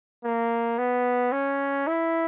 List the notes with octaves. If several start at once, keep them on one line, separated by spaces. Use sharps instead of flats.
A#3
B3
C#4
E4